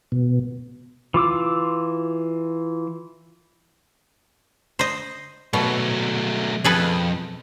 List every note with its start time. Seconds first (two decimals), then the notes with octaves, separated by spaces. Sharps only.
0.12 B2
1.14 E3 F4 D6 E6
4.79 C5 D#5
5.53 B2 F#3 A3
6.64 F2 G#4 A4 B4